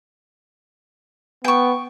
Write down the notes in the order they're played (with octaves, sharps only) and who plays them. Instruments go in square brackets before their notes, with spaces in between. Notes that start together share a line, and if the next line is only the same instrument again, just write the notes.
[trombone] B3 [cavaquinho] G5 C#6